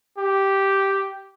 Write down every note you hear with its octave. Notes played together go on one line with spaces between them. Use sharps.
G4